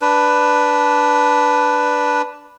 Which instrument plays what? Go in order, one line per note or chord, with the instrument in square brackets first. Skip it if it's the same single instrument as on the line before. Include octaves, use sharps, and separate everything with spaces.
[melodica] D4 B4